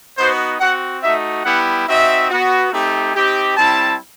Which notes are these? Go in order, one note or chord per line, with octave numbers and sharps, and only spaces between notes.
B3 D#4 F#4 C5
C4 F#4 F#5
A3 D#4 F#4 E5
G3 B3 E4 G4 F#5
C4 D#4 F#4 E5
B3 F#4
A3 C4 D#4 G4
C4 D#4 G4
G3 C4 E4 A5